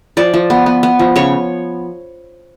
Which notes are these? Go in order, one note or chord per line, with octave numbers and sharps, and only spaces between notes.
F3 D5
F3
B3
B3
B3
F3
C#3 C#5